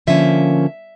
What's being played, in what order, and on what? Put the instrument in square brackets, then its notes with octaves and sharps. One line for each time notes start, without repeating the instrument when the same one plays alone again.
[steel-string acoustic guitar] D3 F3 A#3 C#4 E5